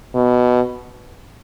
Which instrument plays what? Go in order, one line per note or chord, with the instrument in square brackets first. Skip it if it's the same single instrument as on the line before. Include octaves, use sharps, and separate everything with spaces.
[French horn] B2